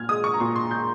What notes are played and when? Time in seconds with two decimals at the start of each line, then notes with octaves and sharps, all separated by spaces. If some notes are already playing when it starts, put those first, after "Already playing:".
Already playing: A#2 F6 G#6
0.09 G#3 D#6
0.24 C#6
0.34 A#5
0.40 A#2 C6
0.56 C6
0.71 G#3 G6